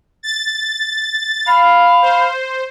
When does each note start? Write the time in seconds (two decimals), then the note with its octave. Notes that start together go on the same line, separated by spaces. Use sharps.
0.23 A6
1.47 F5 B5
2.02 C5